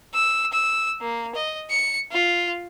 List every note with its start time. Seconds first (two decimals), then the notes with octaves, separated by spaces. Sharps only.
0.14 E6
0.52 E6
1.01 A#3
1.35 D#5
1.70 C#7
2.12 F4